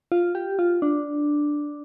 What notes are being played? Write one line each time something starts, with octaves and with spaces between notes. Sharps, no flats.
F4
G4
F4
D4